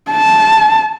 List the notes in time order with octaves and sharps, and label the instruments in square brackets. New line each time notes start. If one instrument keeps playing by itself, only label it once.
[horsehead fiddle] A5